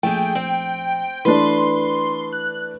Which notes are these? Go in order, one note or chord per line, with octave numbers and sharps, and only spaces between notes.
A#1 A3 G#4 G5
C4
E3 A3 D4 B4 C6
F#6